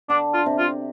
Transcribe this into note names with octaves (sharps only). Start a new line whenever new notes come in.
D3 D4
F4
C3
F4